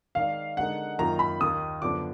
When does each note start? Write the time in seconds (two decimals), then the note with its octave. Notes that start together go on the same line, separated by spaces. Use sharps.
0.15 D#3 G#3 D#4 A#4 D5 F5
0.57 D3 G#3 D#4 A#4 F#5
0.99 F#2 D#3 A#3 F4 A#5
1.19 B5
1.40 D#2 D#3 A#3 D#6
1.82 F#2 D3 F3 B3 D4 D6